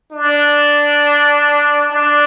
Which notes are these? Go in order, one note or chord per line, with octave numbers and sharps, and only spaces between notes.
D4
D4